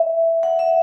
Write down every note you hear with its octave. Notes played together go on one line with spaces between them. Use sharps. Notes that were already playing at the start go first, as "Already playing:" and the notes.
Already playing: E5
F#5
E5